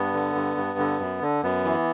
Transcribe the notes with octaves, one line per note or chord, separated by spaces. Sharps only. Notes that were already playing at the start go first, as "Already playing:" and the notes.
Already playing: G2 B3
D3
G2
G2
D3
F#2
D3
F#2 B3
E3